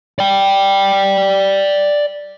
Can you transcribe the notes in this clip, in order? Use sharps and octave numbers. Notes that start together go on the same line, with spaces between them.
D5 G5